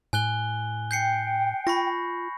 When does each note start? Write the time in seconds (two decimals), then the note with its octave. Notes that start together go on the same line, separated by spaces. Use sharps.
0.13 A2 G#5 F#6 G7
0.91 G5 G6 C7 C#7
1.67 F4 B5 C#6 A#6